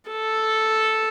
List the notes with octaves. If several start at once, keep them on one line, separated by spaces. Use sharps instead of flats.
A4